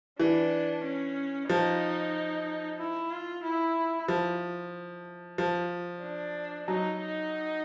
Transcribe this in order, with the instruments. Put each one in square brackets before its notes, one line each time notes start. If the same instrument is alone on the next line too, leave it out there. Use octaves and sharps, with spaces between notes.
[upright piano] E3 [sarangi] D4
[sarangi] C#4
[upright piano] F3 [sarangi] D#4
[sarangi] E4
F4
E4
[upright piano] F3
F3
[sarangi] D4
[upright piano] F#3 [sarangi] D#4
[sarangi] D#4